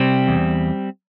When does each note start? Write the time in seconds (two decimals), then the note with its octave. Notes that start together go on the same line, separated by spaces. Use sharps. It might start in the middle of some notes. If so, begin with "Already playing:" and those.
Already playing: C3 G3 C4
0.28 E2